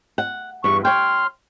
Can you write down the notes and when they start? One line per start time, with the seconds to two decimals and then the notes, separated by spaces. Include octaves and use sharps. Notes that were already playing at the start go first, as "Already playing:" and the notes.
0.18 F#5
0.64 E2 G2 C#6
0.85 C#5 G5 C6 F6